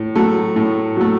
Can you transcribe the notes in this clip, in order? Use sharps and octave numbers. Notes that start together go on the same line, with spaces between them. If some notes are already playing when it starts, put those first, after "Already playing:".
Already playing: A2
F#3 A3
A2
F#3 A3